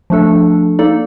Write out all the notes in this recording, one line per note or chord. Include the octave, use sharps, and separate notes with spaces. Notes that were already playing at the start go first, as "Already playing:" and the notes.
F3 A3 D4 A4
A#3 D#4 A4 D5